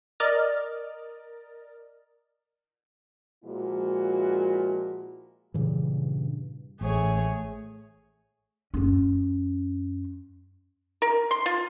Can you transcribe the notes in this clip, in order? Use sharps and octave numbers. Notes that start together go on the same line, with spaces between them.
A#4 D5 D#5 F6 A6
A#2 F3 G#3 E4 F#4
G2 A#2 C#3 E3
A1 A3 G#4 C#5
F#2 C#4
A#4
C6
F4